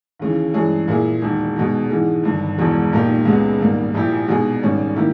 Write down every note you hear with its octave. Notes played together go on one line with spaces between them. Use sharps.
D#2 C#3 E3
G2 E3 G#3 C#4 G#4
A#2 A#3 E4 G#4
E1 D#2 D#3
B2 G#3 D#4
G#2 E3 G#3
G1 G2 D#3
E1 E2 B2 G#3
B1 A#2 A#3 D#4 G4
C#2 C#3 G#3 B3
G#1 G#2 G3 A#3
A#1 A#2 A#3 E4 G4
B2 G#3 D#4 G#4
G#1 G#2 G3 C#4
D#3 A#3 E4 G4